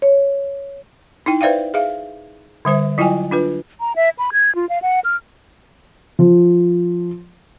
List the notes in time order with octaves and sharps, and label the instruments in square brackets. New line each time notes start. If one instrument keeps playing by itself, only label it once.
[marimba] C#5
[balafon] D#4 E4 G5
B4 C5 D5 E5 F5 G5
G#4 E5 F5
D3 G3 C5 E5
F#3 E4 F4 D#5 G5 G#5
D4 F4 B4
[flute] A#5
E5
B5
G#6
F4
F5
F#5
F6
[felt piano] F3